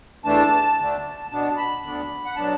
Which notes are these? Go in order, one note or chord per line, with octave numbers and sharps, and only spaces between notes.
E2 E3 A3 D4 A5
D2 D3 A3 D4
B2 B3 D4 A5
B5
D2 D3 B3 D4
F#5
B2 F#3 B3 D4 A5